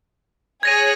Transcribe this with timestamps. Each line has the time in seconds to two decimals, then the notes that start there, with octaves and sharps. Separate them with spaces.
0.63 G#4 C#5 F#6 G#6 A#6 D#7